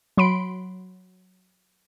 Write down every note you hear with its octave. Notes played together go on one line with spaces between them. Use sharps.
F#3 B5 C6 D7